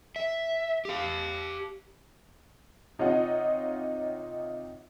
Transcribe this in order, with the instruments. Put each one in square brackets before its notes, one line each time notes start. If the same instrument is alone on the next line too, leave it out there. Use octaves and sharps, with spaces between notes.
[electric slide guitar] E5
G4 F5
[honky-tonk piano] C3 D#4 F4 C#5 D#5 F#5